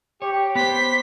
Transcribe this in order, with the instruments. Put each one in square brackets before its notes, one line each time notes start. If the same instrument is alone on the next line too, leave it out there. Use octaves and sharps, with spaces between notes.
[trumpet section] G4 [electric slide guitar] C#5
[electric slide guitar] B3 C5 [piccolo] B6